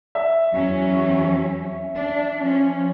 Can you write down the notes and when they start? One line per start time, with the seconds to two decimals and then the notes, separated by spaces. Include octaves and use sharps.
0.15 E5
0.53 E2 F#3 C#4
1.96 D4
2.43 F3 C#4